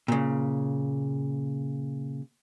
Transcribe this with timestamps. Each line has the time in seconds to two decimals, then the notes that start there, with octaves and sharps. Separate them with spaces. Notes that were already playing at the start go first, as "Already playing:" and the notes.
0.08 A#2 C#3